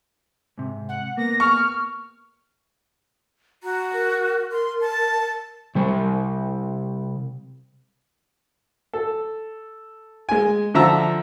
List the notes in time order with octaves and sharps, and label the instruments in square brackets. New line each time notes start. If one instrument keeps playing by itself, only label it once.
[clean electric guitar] G#2 C3
[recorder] F#5
[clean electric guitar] A#3 B3 [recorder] A#6
[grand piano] C#6 [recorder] F6
[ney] F#4 [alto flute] A#5
[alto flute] A#4
[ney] C6
A5
[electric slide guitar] C3 G3
[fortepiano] A4
G#3 G#5
D3 F3 E5 A5 A#5 E6